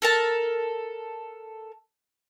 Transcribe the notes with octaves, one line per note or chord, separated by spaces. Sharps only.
A4 A#4 A5